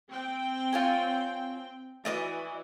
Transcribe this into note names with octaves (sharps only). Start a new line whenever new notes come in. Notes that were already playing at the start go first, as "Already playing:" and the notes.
C4 G5
F4 C#5 G#5
E3 F#4 D5 D#5 D#6